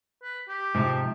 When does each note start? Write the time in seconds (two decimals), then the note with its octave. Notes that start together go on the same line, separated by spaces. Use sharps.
0.23 B4
0.49 G4
0.75 G#2 C3 F3